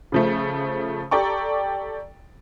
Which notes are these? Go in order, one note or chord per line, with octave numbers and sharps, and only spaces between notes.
C#3 F3 A3
G4 A4 D5 G5 A#5 C#6